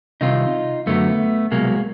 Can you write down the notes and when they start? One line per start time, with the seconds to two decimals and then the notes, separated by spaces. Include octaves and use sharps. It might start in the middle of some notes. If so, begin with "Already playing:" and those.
0.21 C2 C3 D#3 D#4 F4
0.86 F#2 D3 F#3 A3 B3
1.51 C2 B2 F#3 G#3 A#3